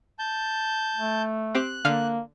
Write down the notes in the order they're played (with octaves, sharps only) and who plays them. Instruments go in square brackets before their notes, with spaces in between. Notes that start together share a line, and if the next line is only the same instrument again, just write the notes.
[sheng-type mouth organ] A5 G6
[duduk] A3
[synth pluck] C4 G4 [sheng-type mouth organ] F#6
[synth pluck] D3 F5 F6 [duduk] A#3